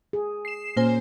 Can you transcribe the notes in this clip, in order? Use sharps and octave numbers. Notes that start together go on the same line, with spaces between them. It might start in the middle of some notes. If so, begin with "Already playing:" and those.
G#4
C7 E7
A#2 A#3 C#4 C5 G#5